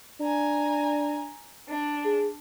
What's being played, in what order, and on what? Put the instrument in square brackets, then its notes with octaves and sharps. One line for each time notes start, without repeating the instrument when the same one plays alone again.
[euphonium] D4 [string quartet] G#5 A#5
[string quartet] D4
[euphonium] G#4